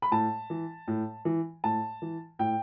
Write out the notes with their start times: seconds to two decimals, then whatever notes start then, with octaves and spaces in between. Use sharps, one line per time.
0.02 B5
0.11 A2 A5
0.50 E3
0.88 A2
1.25 E3
1.64 A2 A5
2.02 E3
2.39 A2 G5